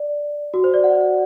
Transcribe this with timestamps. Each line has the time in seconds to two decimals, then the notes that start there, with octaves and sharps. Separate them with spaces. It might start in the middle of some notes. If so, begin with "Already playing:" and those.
Already playing: D5
0.54 F#4
0.64 C5
0.74 D5
0.84 F#5